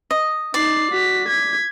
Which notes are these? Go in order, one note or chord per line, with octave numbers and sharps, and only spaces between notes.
D#5
D#4 D5 C7
F#4 B6
G#6 B6